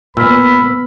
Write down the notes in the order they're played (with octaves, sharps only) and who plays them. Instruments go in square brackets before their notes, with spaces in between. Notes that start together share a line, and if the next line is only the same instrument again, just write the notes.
[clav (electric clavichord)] A#2 [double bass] B3 [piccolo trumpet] B5 [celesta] E6 F6 B6